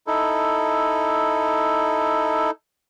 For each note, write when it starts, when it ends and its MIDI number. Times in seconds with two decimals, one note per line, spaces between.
0.07 2.51 63
0.07 2.51 64
0.07 2.51 69